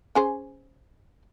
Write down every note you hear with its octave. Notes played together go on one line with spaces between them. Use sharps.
C#4 G#4 C5